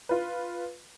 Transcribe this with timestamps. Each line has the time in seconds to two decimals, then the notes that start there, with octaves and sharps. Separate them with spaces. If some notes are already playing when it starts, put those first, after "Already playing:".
0.09 F4 B4